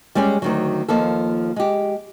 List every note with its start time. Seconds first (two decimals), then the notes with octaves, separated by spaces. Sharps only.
0.15 G3 G#3 C#4 G#4 D5
0.42 D2 D#3 F#3
0.88 D#2 F3 A#3 A4
1.56 G#3 G4